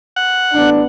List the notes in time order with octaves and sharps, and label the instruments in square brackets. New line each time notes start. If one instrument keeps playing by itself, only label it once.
[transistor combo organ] F#5
[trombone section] A1 B3 D4